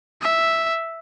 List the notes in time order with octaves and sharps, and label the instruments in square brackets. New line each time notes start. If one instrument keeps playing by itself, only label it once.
[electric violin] E5